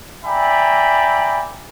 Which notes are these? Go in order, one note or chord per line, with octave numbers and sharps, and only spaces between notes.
D5 E5 G5 G#5 A#5 B5